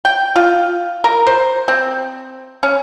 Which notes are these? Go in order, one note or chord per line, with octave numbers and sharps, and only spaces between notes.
G5
F4
A#4
C5
C4
C#4